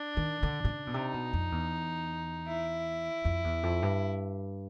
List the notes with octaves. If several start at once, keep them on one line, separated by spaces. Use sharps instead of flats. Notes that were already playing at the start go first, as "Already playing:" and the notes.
Already playing: D4
D#3
D3
C3
C#3
B2
C3 D#4
B2
F2
E2
E4
F2
E2
F2
G2